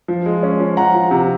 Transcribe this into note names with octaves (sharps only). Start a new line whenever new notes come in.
F3
G#3
C#4
F3
F3 F#5 A#5
F3
C3